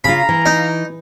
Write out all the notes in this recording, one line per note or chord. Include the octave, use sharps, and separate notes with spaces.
C#3 F4 F5 A#5 B5
E3
D#4